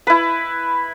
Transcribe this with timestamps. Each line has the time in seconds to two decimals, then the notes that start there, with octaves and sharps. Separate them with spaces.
0.07 E4 B4